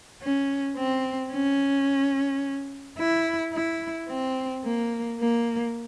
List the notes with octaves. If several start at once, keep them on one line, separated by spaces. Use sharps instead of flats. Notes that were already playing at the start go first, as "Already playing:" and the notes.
C#4
C4
C#4
E4
E4
C4
A#3
A#3